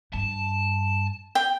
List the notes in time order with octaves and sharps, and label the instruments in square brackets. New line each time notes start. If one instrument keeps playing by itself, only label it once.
[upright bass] G2 [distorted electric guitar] A5
[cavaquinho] G5